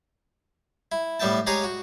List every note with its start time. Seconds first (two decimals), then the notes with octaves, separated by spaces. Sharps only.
0.92 E4
1.20 A2 G3 B3 E5 G5 A5
1.47 G#3 G4 G#4 C#5 A#5 D#6
1.64 F#4